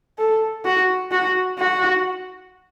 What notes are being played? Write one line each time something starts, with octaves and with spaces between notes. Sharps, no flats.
A4
F#4
F#4
F#4